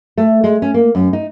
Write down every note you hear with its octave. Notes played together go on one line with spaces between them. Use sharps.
A3
G#3
C#4
A#3
F#2
D#4